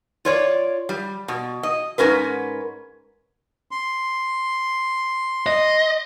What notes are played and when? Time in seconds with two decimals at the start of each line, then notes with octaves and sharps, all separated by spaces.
0.25 F4 C#5 D5
0.89 G3
1.28 B2
1.63 D#5
1.98 G#2 F3 C#4 A#4 B4
3.71 C6
5.46 D#5